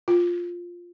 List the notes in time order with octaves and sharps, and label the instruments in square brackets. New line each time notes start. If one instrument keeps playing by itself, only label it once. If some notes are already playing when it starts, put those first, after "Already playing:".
[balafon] F4